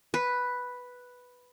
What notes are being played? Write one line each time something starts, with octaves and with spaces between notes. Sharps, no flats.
B4